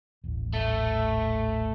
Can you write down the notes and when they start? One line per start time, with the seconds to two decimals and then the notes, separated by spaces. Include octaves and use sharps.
0.24 D#1 A1
0.53 A3